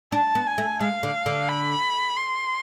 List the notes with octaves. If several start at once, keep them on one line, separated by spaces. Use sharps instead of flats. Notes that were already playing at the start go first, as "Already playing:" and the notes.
D4 A5
B3
G#5
A3
G#3 F5
D3
D3
B5
C6